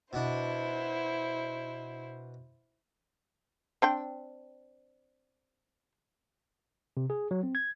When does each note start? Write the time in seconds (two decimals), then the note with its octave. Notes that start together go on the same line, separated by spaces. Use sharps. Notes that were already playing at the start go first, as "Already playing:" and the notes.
0.13 B2 D4 E4 C5
3.82 C4 D4 G5
6.97 C3
7.10 G#4
7.31 F#3
7.43 C4
7.55 G#6